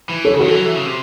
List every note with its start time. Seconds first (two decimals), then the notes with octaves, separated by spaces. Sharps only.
0.09 E3
0.25 A4 C#5
0.34 C#3
0.39 D#3 F#4 A4
0.48 E3
0.55 F#3
0.65 E3
0.76 C#3
0.86 C3